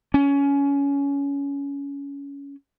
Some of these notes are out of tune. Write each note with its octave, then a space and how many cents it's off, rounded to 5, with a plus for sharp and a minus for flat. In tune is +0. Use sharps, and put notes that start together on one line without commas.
C#4 +20